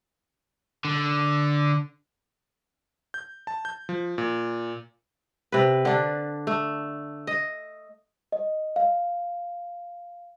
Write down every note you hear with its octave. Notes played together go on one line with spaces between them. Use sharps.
D3
G6
A5
G6
F3
A#2
C3 B4
D3 D4
A3
D#5
D#5
F5